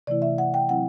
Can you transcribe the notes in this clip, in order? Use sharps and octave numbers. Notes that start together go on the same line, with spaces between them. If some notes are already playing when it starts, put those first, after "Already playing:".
C3 E3 A3 E4 D5
E5
F#5
G5
F#3 C4 E4 F#5